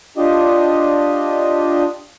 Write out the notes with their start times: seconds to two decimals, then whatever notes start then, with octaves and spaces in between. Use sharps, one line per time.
0.17 D4 F4 G4 D#5